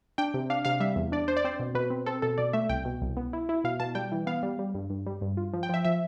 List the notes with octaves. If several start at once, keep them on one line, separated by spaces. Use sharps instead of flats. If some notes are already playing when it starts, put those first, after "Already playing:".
D4 G5
C3
D4 F5
C3 F5
G3 E5
E2
D4 D5
D4 C5
D5
C4 C5
B2
B2 B4
C4
C4 A4
B2 A4
B2 D5
A3 E5
C2 G5
B2
C2
B3
E4
E4
B2 F5
B2 A5
G3 G5
E3
B3 F5
G3
G3
G2
G2
G3
G2
F4
F3
G5
F3 E5
F3 E5